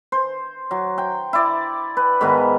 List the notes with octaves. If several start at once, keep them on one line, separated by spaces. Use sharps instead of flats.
C5
F#3
G5
E4 D5
B4
G#2 D#3 B3